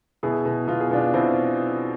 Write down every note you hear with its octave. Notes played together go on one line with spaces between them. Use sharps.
B2 E4 G#4
B2
B2 F4
G#4
B2 D4 F4
F4
B2 C4 E4